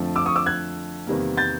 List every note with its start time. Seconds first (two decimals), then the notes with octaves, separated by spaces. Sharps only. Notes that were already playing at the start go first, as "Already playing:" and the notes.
Already playing: F2 D3 F3 A3
0.16 D6 E6
0.26 C#6 D#6
0.36 D6 E6
0.46 F#6 G#6
1.07 E2 C3 D#3 G3 A#3
1.37 G6 A6